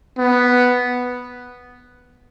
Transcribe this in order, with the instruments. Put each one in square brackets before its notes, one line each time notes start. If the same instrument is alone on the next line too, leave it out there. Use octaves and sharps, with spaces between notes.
[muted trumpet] B3